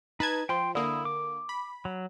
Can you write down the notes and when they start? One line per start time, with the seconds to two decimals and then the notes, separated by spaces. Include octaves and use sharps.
0.20 D#4 B4 A5 G#6
0.49 F3 G5 C6
0.75 D3 A#3 E4 D#6
1.05 D6
1.49 B5
1.85 F#3